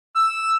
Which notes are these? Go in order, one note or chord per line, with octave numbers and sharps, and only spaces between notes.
E6